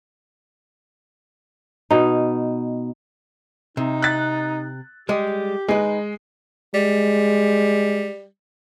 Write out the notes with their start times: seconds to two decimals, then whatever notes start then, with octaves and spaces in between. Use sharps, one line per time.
1.91 B2 D#4
3.77 C3 D#4
4.02 F#6 A6
5.09 G3 G#3 G4
5.68 G#3 D#4 B4 D#5
6.74 G3 G#3